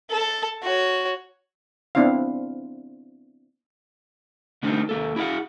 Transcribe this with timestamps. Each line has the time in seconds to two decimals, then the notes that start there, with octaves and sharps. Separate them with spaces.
0.11 A4 A5
0.63 F#4 C#5
1.95 B3 C4 D4 E4 C5 F5
4.63 D3 A3 A#3 C4 D4 D#4
4.89 D#2 A#3 A4
5.16 E4 G#4 A#4 F5 F#5